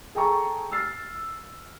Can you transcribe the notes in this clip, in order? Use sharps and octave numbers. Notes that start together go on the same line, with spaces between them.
G#4 A4 G5 A5 A#5 C#6
E6 F6 A6 C7